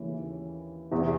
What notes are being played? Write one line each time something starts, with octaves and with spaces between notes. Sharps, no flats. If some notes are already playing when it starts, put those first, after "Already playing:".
Already playing: D#2 C#3 E3
E2 C3 E3